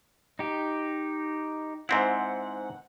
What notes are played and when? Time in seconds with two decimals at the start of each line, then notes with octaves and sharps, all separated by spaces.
0.39 D#4 G4
1.89 G#2 C4 E4 F#5